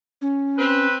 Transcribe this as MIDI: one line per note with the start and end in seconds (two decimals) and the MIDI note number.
0.22 0.87 61
0.58 0.98 60
0.58 0.98 71